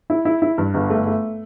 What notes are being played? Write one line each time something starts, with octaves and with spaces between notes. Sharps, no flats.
E4
E4
E4
G2
G1
A3
A3